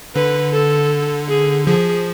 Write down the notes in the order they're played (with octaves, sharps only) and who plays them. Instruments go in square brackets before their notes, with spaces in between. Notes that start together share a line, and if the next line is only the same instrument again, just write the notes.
[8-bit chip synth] D3 [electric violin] B4
[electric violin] A4
G#4
[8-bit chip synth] F3 [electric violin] G#4